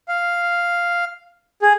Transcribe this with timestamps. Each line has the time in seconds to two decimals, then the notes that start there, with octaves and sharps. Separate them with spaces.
0.08 F5
1.62 G#4